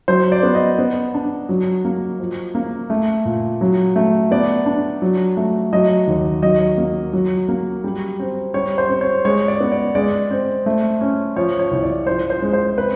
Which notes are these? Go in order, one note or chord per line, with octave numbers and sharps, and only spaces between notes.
F#3 C5
D5
B3
D#5
B3
D4
F#3
A#3
F3
A#3
A3
A#2
F#3
A3
B3 D5
D4
F#3
A3
F#3 D#5
D#2
F#3 D#5
A#3
F#3
A#3
G3
C4
G3 C#5
C5
C4
C#5
G#3 C#5
D5
B3
D5
G#3 D5
C4
A3
C#4
F3 C#5
C#5
C2
D5
F3 C5
C5
G#3
C5
C4 B4